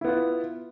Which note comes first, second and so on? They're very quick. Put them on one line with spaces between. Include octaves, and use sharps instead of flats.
E4 B3 F4